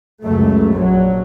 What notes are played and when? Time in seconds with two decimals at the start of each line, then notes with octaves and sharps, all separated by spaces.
0.23 C#2 F#2 A3
0.74 A#1 F#3